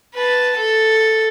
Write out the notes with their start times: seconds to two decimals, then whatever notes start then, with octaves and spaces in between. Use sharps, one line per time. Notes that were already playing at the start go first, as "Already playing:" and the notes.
0.15 B4 A5
0.56 A4